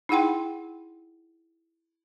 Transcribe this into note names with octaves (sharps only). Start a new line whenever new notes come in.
D#4 E4 G#4 F#5 G5 C6